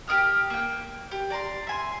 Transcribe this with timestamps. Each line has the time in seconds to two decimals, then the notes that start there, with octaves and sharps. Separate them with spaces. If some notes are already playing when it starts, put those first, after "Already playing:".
0.07 G4 A#4 D#6 F6
0.50 A#3 G5
1.11 G4
1.30 D5 A#5 C6
1.67 E5 G#5 C6